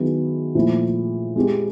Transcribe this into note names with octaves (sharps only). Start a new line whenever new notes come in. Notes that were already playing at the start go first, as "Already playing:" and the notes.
Already playing: D#3 F#3 B3 E4 G#4
A#2 F3 A3 C#4 E4
G#3 C4 E4 G4